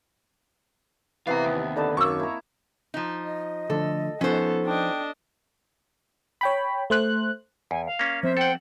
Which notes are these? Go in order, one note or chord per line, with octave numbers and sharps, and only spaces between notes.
C3 E3 B3 F5 A#5
D#2
D3 D#4 B4 A5
F#2 A#3 C#6 E6
E4 A#5
F3 D#4
D#5
D3 F3 A3 A4
F3 B3 C#4 D#4 A4 C5
D4 D#5 G5
C#5 G5 B5
A3 C5 F#6
E2 G#5
F5
A#3 C#4
F3 B3 C4 C5 E5
A4 F#5 G5